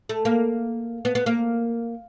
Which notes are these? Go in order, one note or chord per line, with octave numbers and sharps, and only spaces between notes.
A3
A#3
B3
B3
A#3